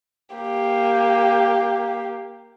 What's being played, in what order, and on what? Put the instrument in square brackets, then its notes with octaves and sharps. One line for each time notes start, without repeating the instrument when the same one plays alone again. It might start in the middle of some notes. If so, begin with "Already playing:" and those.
[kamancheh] A#3 G4